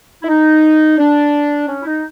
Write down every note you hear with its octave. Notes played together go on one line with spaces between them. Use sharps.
E4
D#4
D4
C#4
E4
D#4